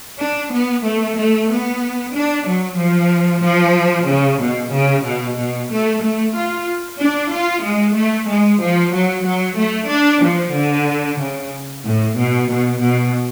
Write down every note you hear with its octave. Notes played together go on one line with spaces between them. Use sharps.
D4
B3
A3
A3
B3
D4
F#3
F3
F3
C#3
B2
C#3
B2
B2
A3
A3
F4
D4
F4
G#3
A3
G#3
F3
F#3
F#3
A3
D4
F3
D3
C#3
A2
B2
B2
B2